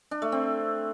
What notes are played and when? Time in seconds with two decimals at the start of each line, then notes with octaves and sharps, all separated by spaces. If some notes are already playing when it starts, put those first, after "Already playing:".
0.11 D4
0.22 A3
0.32 C4